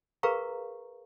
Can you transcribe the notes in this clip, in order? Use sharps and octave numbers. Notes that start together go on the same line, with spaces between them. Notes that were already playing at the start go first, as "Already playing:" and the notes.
G#4 A#4 B4 F5 A#5 C#6